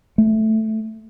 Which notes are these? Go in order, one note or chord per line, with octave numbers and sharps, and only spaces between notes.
A3